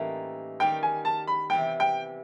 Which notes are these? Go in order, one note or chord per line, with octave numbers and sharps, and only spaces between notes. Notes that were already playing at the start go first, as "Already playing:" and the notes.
Already playing: A2 E3 G3 A#3 C#4 D#4
D#3 G3 A#3 G5
G#5
A5
B5
C3 E3 G3 B3 G5
G5